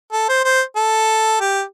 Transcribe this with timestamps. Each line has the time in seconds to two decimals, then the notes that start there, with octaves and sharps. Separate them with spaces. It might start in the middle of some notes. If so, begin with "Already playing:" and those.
0.13 A4
0.29 C5
0.45 C5
0.76 A4
1.40 G4